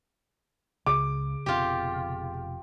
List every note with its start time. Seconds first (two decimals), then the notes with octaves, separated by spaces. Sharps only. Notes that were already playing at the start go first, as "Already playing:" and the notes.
0.86 C#2 C#3 D6
1.46 F1 B2 C4 F4 G4